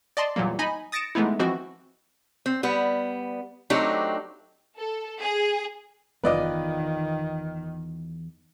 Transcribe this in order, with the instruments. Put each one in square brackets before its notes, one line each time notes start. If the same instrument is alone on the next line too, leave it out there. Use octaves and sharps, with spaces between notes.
[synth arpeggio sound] D5 D#5 A5 C6
E2 A#2 F#3 G3 A#3
D#4 D#5 G#5 B5
D#6 A6 A#6 C#7 D7 E7
E3 G#3 A3 B3 D#4 E4
E3 F3 C4 F#4 D#5
[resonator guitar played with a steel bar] C4
G3 B3
F#3 A3 C4 D4 D#4 G4
[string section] A4
G#4
[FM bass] F#1 [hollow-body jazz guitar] E2 F4 [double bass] D#3 [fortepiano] B4 D5 D#5